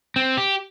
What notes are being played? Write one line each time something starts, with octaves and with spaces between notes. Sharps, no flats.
C4
G4